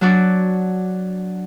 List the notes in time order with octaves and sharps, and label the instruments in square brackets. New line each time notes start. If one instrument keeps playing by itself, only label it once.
[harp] F#3 D4 F#4 D5